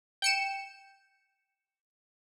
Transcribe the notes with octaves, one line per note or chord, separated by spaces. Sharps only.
G5 C#7 E7